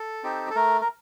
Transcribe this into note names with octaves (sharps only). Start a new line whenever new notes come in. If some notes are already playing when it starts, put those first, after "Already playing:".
Already playing: A4
C4 D#4 G4
A4
A3 A#4
A#4